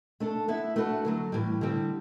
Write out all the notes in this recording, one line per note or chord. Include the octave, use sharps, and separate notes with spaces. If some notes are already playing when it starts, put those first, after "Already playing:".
A3 D4 A4
B3 E4 B4 E5
A3 D4 F#4 B4
D3 F#3 A3
A2 E3 G3
D3 G3 C4